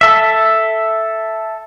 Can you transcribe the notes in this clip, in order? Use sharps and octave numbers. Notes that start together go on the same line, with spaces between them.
A4 E5